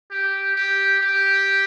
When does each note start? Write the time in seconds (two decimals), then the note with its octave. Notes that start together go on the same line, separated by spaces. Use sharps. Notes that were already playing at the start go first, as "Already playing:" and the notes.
0.11 G4
0.56 G4
1.01 G4